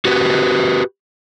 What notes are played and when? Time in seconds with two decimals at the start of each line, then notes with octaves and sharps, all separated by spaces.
0.05 F#4 G4 B4